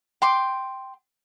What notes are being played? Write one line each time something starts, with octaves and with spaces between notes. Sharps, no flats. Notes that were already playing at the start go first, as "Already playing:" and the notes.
G5 C6 D6